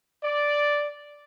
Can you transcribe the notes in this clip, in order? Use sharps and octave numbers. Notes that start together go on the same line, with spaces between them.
D5